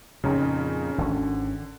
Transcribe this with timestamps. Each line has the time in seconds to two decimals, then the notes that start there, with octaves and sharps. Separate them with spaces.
0.24 F2 A#2 C#3 C#4 D#4
0.98 G#1 D3 C#4